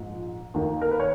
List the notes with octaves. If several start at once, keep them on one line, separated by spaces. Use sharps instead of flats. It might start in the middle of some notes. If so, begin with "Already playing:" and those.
Already playing: A#1 G#2
D#2 D#3 A#3
A#4
B4
C#5